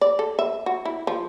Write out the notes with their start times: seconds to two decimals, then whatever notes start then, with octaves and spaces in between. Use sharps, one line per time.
0.01 D5
0.19 A4
0.39 E5
0.66 F#4
0.85 E4
1.07 F3